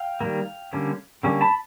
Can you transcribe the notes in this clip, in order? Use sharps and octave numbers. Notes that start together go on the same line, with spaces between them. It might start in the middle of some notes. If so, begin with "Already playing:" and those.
Already playing: F5 G5
D#3 G3 A#3
D3 G3 A#3 C#4
D3 G3 A#3 C#4
A5 B5